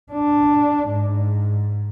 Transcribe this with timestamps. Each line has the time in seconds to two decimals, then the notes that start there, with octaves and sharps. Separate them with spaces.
0.12 D4
0.89 G#2